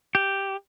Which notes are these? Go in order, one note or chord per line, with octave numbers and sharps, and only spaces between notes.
G4